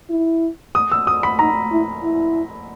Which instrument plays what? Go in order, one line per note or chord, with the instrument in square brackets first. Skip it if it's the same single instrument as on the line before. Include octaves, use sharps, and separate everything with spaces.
[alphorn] E4
[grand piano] D#6
E6
D#6
B5
[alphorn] D#4 [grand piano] A#5
[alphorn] E4
E4